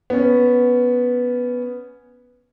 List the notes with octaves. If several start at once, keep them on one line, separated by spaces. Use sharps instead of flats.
B3 C#4